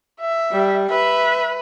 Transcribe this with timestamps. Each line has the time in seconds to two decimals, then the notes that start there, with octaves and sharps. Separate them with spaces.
0.20 E5
0.52 G3
0.90 B4 E5